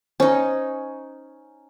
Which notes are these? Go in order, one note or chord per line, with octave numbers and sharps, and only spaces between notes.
C#4 D#4 C5